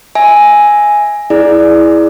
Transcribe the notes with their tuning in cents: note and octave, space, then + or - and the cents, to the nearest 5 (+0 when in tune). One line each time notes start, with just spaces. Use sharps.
E5 -10 G#5 +0
E4 -5 G#4 +10 D5 +0